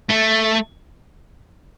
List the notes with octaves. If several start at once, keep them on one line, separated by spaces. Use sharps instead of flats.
A3